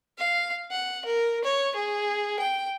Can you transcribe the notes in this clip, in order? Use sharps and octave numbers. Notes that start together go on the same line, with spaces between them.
F5
F#5
A#4
C#5
G#4
G5